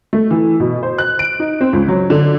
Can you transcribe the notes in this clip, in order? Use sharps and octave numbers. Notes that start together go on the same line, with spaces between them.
A3
E3
B2
C5
F#6
D7
D#4
C4
C#2
F#3
D3